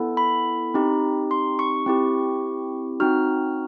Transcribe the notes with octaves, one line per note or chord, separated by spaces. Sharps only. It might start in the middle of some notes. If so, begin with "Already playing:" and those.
Already playing: B3 E4 A4
B5
C4 D#4 G4
C6
C#6
C4 E4 G4
C4 D#4 F#4 F6